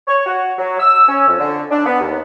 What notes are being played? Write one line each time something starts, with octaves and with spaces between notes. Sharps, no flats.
C#5
F#4
F#3
E6
C#4
F2
D3
D4
B3
D#2